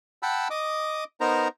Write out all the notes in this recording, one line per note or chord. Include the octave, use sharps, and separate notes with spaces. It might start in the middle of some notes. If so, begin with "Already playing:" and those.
F#5 G5 A5 B5 E6
D#5 D6 D#6
B3 D#4 A#4 C5 A#5